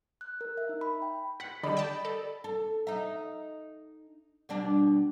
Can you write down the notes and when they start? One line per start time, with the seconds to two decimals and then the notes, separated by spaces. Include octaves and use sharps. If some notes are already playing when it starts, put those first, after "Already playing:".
0.21 F#6
0.41 A#4
0.57 E5
0.69 D#4
0.81 B5
1.02 G5
1.40 F#5 B6
1.63 D3 G3 D5 D#5 B5
1.77 G5 A5
2.05 A4
2.44 A4
2.87 D#4 E5
4.49 B2 G3 D4